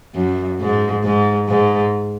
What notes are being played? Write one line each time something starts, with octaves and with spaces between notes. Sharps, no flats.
F#2
G#2
G#2
G#2